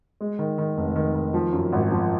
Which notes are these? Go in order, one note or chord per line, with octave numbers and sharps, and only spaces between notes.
G#3
D#3
D#3
F1
D#3
D#3
F3
F#2
G#1
F3